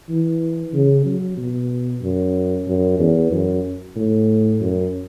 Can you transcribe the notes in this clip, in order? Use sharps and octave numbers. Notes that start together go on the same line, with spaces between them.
E3
C#3
F#3
B2
F#2
F#2
E2
F#2
A2
F#2